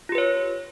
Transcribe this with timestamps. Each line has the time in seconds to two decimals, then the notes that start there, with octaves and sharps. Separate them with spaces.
0.09 F4
0.12 G4
0.15 B4
0.18 C#5